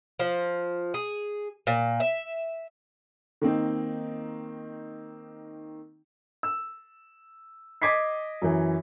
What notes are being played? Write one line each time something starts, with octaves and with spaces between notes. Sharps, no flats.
F3
G#4
A#2
E5
D#3 A#3 C4 D#4
E6
D#5 D6 G#6 B6 C7
F#2 E3